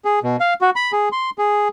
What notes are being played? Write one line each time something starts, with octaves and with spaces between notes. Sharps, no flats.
G#4
B2
F5
F#4
B5
G#4
C6
G#4